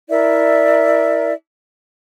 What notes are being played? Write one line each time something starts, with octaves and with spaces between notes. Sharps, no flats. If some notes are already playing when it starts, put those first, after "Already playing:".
E4 A#4 D5 E5